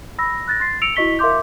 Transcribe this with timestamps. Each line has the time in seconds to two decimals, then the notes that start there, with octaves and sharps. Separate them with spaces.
0.18 B5 E6 A#6
0.48 F#6 A6 A#6
0.60 C6 A6 C7
0.82 E6 C#7 D7 F7
0.96 E4 F#4 D#5 C#6 B6 G7
1.19 A#4 E5 F5 C6 D6 G6